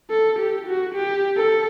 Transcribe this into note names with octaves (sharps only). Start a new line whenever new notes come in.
A4
G4
F#4
G4
A4